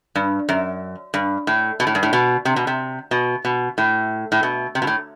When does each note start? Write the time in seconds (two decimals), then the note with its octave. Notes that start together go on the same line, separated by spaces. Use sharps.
0.15 G2
0.49 F#2
1.14 G2
1.47 A2
1.80 B2
1.87 A2
1.95 G2
2.03 A2
2.13 B2
2.45 C3
2.56 B2
2.67 C3
3.11 B2
3.45 B2
3.78 A2
4.32 A2
4.43 B2
4.75 C3
4.82 B2
4.87 A2